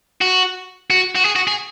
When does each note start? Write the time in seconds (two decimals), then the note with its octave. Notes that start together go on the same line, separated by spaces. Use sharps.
0.21 F#4
0.90 F#4
1.15 F#4
1.25 G#4
1.36 F#4
1.47 G#4